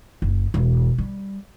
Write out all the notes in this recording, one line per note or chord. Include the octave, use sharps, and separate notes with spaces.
F#1
E1
G3